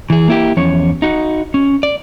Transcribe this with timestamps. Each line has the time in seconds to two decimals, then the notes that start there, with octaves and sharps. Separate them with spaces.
0.10 E3 G#4
0.28 A#3 E4 G4
0.57 E2 F3 C#4 C#5
1.02 D#4 F#4
1.54 C#4
1.83 D5